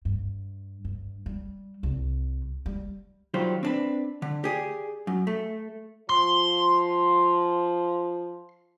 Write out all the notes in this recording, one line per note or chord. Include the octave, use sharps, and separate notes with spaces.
G2
G2
G3
C2
G3
D#3 F#3 G3 F4 C5
C4 D4 B4
D3
G4 G#4 D5
F#2
A3
F3 C6